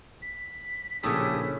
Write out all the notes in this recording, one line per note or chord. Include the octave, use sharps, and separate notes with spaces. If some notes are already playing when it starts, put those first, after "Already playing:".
B6
A#1 A2 C#3 G4 A4 D#6